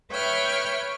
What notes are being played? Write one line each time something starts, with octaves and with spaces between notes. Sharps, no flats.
B4 C#5 E5 G5 C#6 F6